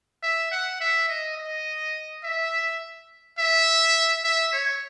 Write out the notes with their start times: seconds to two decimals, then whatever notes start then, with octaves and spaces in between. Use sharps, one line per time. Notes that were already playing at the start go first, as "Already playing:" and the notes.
0.23 E5
0.51 F#5
0.80 E5
1.08 D#5
1.38 D#5
2.24 E5
3.38 E5
4.24 E5
4.53 C#5